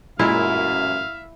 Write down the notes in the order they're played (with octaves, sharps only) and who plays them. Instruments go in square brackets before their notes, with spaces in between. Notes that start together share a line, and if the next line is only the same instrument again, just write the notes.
[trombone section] A1 F#2 [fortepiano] A#2 G#3 [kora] E4 [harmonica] E5 F5